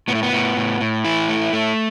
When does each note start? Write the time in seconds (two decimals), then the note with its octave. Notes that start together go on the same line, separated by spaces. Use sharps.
0.08 A2 B3
0.15 A3
0.23 B3
0.33 A2
0.57 A2
0.81 A2
1.05 E3 E4
1.29 A3
1.53 A3